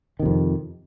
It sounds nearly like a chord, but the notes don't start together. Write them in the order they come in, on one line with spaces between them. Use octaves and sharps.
D#3 C3 F2